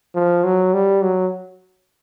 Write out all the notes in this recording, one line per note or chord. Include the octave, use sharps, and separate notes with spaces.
F3
F#3
G3
F#3